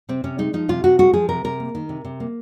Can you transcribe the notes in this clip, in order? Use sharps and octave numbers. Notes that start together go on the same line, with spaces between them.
C3 C4
C3 C#4
G#3 D#4
F3 D#4
C3 F4
C3 F#4
G#3 F#4
F3 G#4
C3 A#4
C3 A#4
A#3
D#3
C3
C3
A#3